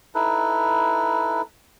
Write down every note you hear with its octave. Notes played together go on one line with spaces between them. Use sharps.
D#4 E4 A4 B4